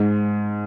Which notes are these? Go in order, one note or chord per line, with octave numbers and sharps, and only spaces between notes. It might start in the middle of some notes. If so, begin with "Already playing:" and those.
Already playing: G#2